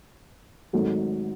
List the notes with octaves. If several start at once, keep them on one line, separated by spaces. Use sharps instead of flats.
G#1 G#2 F#3 A3